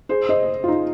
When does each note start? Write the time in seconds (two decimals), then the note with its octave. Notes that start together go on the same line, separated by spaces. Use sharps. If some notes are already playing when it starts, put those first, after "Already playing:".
0.09 G#4 C5
0.29 C5 D#5
0.64 F4
0.68 D#4